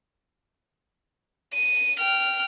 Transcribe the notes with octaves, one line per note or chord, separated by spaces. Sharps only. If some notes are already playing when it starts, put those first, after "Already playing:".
D#7
G5 F6